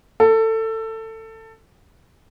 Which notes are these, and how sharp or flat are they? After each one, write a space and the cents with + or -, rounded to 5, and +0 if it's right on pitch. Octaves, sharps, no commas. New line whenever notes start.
A4 +20